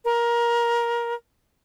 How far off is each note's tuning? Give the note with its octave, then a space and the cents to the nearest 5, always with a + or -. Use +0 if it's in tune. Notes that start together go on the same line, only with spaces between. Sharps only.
A#4 +20